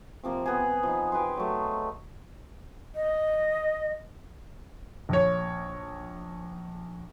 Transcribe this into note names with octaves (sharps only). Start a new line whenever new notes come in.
C3 F3 A#3
B3 G#4
F3 D#4
G4 B4 G#5 C6
F#3 A3
D#5
A#1 C#5